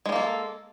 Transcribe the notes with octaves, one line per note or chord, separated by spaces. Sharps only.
G3 G#3 A#3 A4